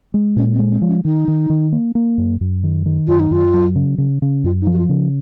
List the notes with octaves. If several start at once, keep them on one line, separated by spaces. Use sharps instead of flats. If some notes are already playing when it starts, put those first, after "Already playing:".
G#3
A#2 C#4
C4
G#3
C4
F3
C#4
D#3 D#4
D#3
D#3
A#3
A#3
F#2
F#2
D#3
D#3
F#2 F4
D#4
F#2 F4
F#3
C#3
C#3
C#3
F#2 F4
D#4
F3
F#4
F4
C#3